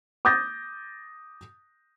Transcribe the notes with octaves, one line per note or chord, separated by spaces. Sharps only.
D6 D#6 G6 A6 A#6